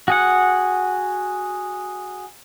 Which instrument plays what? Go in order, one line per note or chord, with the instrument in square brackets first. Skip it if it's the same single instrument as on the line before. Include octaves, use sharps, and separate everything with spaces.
[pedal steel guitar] F#4 G#4 F#5